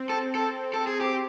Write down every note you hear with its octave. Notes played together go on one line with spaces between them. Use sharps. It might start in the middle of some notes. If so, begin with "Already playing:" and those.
Already playing: C4
A4
A4
A4
G#4
G4